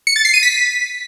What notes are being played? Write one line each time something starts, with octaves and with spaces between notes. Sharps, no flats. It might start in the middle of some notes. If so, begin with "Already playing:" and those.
C#7
A6
C7
D#7
B6